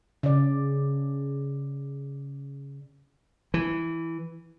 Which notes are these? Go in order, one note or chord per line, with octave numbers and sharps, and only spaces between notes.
C#3 D5
E3